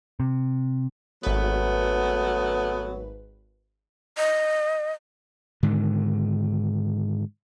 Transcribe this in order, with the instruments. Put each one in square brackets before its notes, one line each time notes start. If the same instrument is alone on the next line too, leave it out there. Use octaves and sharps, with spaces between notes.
[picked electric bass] C3
[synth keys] G#1 B4 [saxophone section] F#3 A3 B3
[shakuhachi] D#5
[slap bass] G#2 D3 D#3